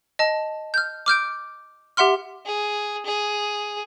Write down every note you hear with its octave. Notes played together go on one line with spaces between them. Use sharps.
D#5 A5
F6 G6
D6 F6 G6 D7
G4 E5 F#5 C6 F6
G#4
G#4